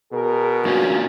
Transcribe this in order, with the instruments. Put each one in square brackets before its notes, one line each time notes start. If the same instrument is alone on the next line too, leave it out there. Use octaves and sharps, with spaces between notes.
[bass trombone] B2 [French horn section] G#4 A#4
[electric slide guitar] G2 A#2 C#4 [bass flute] F#4